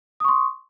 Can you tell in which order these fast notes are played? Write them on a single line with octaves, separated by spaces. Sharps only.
D#6 C#6 C6